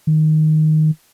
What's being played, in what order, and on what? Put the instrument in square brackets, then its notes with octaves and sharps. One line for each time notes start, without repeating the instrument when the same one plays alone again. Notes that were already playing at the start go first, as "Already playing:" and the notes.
[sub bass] D#3